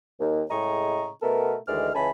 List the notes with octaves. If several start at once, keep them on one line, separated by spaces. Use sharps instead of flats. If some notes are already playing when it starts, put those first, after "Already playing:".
D#2
A2 C#3 G#3 D#5 A#5 C#6
B2 A3 B3 A4 A#4
D2 D#3 E3 G#3 D5 F6
C#2 E3 C#4 G#5 A5 B5